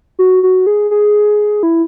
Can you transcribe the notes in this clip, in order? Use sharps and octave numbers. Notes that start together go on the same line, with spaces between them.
F#4
F#4
G#4
G#4
E4